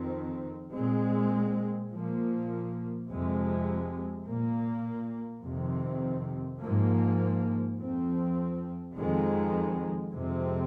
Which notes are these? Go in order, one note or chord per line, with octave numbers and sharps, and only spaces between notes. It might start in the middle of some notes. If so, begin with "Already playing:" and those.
Already playing: F2 D#3 C4
A#2 G#3 C4
A#2 F3 A#3
F2 C3 G#3
A#2 A#3
F2 C3 D#3 C4
G#2 F3 A#3
F2 F3 C4
F2 D#3 G#3
F2 C3 G#3 C4